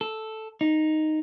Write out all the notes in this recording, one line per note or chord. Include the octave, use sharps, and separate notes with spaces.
A4
D#4